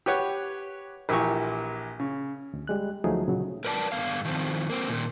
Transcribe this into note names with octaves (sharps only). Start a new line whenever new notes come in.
G4 B4 C#5 F#5
A#1 A#2 E3 G4 C#6
C#3
D2
G3 G#3 F#6
D2 F3 F#3 A3 D#4 G#4
A#2 C#3 F#3
A#4 B4 D5 A5
G2 D3 E3 B3 F5
D#3 F3 C4
A#3 C4
A#2 D#3